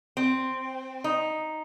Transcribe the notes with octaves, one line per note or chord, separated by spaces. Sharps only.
C4
D#4